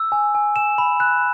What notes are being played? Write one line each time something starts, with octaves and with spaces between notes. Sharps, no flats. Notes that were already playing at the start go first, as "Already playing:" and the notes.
Already playing: E6
G#5
G#5
G#5 E7
B5
F#6